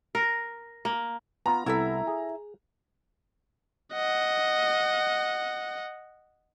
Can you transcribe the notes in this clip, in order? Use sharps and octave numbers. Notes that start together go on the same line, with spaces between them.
A#4
A#3
B3 F4 A#5
C2 B3 E4 A4 E5
G#4
D#5 F#5